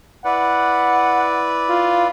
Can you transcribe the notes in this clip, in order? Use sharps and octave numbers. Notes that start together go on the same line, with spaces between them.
E4 B4 D5 F#5
F4